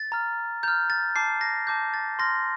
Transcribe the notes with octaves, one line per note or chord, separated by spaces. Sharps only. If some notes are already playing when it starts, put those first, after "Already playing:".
Already playing: A6
A#5 F6
A#5 F6 G6
A6
A5 D6 G6 C7
A#6
A5 D6 G6
A6
C6 F6 A#6